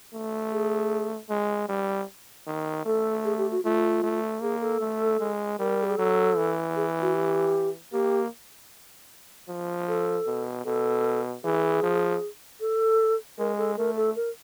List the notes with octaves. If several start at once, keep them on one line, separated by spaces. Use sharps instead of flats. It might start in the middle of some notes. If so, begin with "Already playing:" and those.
A3
G#4
G#3
G3
D#3
A3 A4
G#4
G4
F#4
A3 F4
A3
A#3 G#4
A4
A3
G#3
G3 A#4
G4
G#4
F#3 A4
E3
G#4
F#4
G4
A#3 G4
F3
A4
B2
B2 A4
E3 G#4
F3
A4
G#3 A#4
A4
A3 A#4
A4
A#4